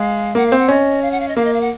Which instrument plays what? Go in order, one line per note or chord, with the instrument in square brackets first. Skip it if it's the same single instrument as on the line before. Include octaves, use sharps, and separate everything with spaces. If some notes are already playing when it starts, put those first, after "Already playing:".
Already playing: [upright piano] G#3 [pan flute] F5
[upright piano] A#3 [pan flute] F#5
[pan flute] F5
[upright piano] C4
[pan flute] F#5
[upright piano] C#4 [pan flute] D#5
[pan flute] F5
F#5
F5
D#5
[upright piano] A#3 [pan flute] F5
[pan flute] D#5
F5
F#5